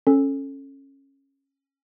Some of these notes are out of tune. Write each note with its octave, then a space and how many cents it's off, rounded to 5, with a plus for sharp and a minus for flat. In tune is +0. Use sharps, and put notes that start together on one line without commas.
C#4 -15 A4 +0